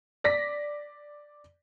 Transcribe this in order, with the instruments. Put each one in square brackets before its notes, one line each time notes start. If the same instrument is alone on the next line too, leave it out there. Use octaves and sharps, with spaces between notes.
[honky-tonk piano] D5 A#6 B6